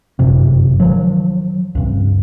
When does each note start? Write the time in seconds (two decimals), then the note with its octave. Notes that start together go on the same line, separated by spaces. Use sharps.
0.19 G1 F#2 C3
0.80 D#3 F3 F#3
1.75 C#2 G2